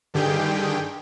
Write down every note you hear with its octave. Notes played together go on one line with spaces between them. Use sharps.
G2 D3 D#3 G4 G#4 G5